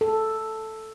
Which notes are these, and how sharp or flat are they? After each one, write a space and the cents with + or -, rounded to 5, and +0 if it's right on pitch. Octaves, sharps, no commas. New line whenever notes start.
A4 +0